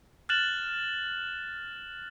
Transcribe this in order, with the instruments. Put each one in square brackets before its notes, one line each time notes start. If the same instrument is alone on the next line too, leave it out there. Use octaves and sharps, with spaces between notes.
[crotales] F6 F#6 A6 E7 F#7